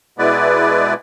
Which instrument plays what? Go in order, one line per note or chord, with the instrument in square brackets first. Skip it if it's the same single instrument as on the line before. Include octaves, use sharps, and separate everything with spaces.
[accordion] B2 G#3 B3 E4 B4 D5